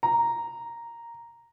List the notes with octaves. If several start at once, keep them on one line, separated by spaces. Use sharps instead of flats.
A#5